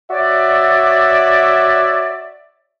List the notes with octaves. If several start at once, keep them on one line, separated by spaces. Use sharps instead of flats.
F#4 C#5 D5 E5